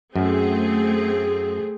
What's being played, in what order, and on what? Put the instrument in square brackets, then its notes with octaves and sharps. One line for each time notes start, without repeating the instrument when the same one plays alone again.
[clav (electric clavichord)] F#2 [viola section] A3 C4 G#4